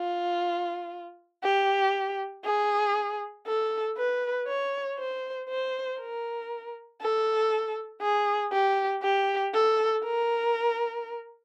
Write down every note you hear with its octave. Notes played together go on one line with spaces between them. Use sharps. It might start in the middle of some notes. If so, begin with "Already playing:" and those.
Already playing: F4
G4
G#4
A4
B4
C#5
C5
C5
A#4
A4
G#4
G4
G4
A4
A#4